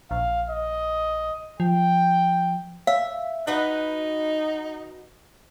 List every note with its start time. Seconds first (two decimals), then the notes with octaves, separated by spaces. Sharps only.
0.11 A#1 F5
0.50 D#5
1.60 F3 G5
2.87 E5 F5
3.47 D#4 F#4 B4 F#5